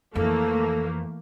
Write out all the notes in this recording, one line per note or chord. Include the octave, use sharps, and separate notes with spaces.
F2 E3 A3 A#3 A4